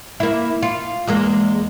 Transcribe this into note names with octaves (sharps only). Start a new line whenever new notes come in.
A#3 E4
F4
E2 G#3 A#3